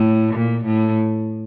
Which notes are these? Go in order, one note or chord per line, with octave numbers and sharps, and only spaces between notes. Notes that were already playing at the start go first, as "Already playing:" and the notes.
Already playing: A2
A#2
A2